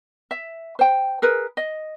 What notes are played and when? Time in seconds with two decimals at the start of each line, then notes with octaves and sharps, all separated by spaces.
0.31 E5
0.79 C5 G5
1.22 G#4 A#4 B4
1.57 D#5